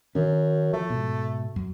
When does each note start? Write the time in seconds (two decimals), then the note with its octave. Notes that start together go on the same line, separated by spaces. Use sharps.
0.15 F#2 D#3 C#4
0.73 F3 A3
0.90 G#2 B2
1.56 F#2